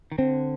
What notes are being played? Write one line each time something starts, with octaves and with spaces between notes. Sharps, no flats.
D#3
D3 C4